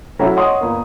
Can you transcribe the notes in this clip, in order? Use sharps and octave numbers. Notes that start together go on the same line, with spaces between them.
F#3 A3 C#4 E4 F#4
C#5 D#5 F#5 C6 C#6 D#6
G1 A#3